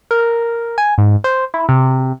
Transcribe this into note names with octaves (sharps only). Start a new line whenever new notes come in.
A#4
G#5
G#2
C5
E4
C3